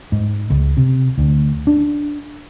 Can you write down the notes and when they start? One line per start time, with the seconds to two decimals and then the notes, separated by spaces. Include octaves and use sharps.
0.12 G#2
0.50 C#2
0.77 C3
1.18 D2
1.67 D4